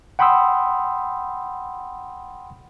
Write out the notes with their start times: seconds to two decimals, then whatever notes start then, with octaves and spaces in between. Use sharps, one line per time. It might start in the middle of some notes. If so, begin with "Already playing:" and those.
0.19 F#5 G5 B5 C6 D#6 E6